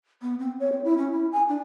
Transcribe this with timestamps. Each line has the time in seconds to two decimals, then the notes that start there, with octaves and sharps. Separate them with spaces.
0.22 B3
0.39 C4
0.60 C#5
0.72 C4
0.84 E4
0.98 C#4
1.12 E4
1.32 G#5
1.49 D4